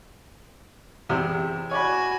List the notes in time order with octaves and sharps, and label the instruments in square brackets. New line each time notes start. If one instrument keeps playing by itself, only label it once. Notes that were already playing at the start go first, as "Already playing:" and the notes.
[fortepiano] E2 C3
[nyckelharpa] F#4 G#5 [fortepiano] C#5 D5 B5